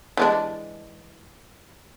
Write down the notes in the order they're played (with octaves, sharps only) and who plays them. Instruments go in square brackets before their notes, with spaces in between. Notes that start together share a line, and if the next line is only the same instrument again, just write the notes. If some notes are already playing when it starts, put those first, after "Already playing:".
[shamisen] E3 G#3 D4